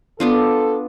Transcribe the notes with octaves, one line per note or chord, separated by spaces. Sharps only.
B3 D4 F4 A4